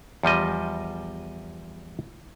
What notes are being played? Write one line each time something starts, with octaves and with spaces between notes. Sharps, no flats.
E2 F3 G3 D#5